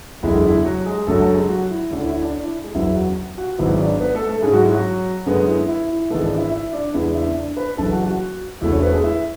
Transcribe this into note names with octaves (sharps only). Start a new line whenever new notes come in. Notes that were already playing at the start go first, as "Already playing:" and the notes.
F#1 E2 D3 G#3 E4
E4
F#3 F#4
G#3 G#4
F#1 F#2 D3 F#3 A3 A4
A3 A4
G#3 G#4
F#3 F#4
E4
D2 D3 A3 C#4 D4
E4
E4
D4
D4
E4
G#3 G#4
F#1 E2 C#3 F#3 B3 E4 E5
F#4 F#5
F#4 F#5
G#1 G#2 F#3 B3 E4 E5
D4 D5
B3 B4
A3 A4
A3 A4
G#2 G#3 C#4 G#4
F#3 F#4
E4
F#3 F#4
F#2 D3 G#3 B3
E4
E4
E4
G#1 G#2 E3 A3 B3 A4
D4 D5
E4 E5
E4 E5
D4 D5
E2 C#3 G#3 B3 D4 E4 E5
E4 E5
D4 D5
B4 B5
F#1 F#2 E3 A4 A5
F#4 F#5
F#4 F#5
E1 E2 D3 A3 E4 E5
C#4 C#5
B3 B4
G#3 G#4
E4 E5